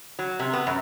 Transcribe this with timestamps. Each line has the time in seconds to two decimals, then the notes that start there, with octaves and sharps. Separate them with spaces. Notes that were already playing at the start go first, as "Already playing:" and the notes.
0.19 F#3
0.40 C3
0.53 B3
0.67 F#2